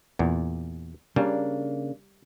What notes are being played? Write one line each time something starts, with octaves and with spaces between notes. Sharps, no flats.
E2 A#2
C#3 G3 A#3 D4